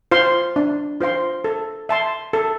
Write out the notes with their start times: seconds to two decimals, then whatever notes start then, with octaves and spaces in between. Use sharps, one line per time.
0.11 F4 C5 F5 C6
0.56 D4
1.01 F4 C5 F5 C6
1.44 A4
1.89 E5 A5 C6
2.33 A4